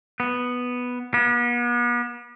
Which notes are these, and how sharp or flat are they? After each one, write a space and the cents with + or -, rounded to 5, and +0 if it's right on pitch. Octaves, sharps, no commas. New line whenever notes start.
B3 +0
B3 -40